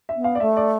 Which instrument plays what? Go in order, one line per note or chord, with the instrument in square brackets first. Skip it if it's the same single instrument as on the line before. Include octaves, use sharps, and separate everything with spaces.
[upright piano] E5
[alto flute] B3
[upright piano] F5
D5
[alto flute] A3 [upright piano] E5
[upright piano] D5